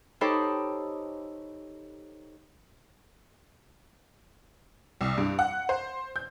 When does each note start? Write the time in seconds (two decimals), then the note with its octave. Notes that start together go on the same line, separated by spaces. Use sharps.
0.21 D#4 G4 A4 C5 C#5 B5
5.01 C2
5.18 G2
5.39 F#5
5.69 C5
6.16 G6